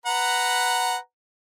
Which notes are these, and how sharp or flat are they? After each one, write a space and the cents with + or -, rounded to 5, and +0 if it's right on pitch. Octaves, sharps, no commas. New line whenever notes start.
B4 +0 F#5 +0 A#5 -5